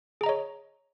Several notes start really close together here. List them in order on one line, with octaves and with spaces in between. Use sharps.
G#4 A#5 D#5 C#5